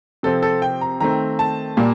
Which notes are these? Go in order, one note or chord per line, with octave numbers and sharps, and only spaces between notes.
C3 F3 C4 A4
A4
G5
A#5
D#3 A3 C4 A#5
A5
A#2 G3 A#3